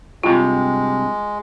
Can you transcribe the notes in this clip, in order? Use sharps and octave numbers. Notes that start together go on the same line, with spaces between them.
G2 C3 G#3 F4